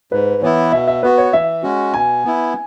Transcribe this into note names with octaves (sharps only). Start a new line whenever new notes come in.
G#2 B4
E3 B3 E4 C#5
B2 E5
E5
B3 F#4 B4
C#5
E3 E5
G#3 C#4 F#4
B2 G#5
B3 E4